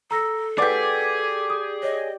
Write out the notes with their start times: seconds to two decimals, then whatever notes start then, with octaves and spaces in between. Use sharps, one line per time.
0.11 A4 A#5 E6 A#6
0.58 G4 G#4 B4 D5 F#5 D6
1.50 D#6
1.83 C#5 D#5